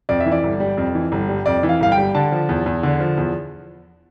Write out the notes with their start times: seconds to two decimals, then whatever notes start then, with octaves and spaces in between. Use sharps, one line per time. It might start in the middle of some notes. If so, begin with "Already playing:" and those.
0.09 F2 D5
0.20 E5
0.26 E3
0.32 D5
0.43 G1
0.60 G3
0.77 F2
0.95 E3
1.12 G1
1.29 G3
1.46 F2 D5
1.63 E3
1.69 F5
1.80 G1 F5
1.92 G5
1.98 G3
2.15 D3 A5
2.32 F3
2.49 E2
2.66 E2
2.83 D3
3.00 F3
3.17 E2